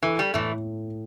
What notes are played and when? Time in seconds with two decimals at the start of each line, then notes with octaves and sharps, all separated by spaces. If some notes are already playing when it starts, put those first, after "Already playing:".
0.02 E3 A4
0.19 G3
0.34 A2 E3 A3